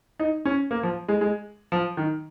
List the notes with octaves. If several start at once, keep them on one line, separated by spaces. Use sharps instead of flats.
D#4
C#4
A#3
F3
G#3
G#3
F3
D#3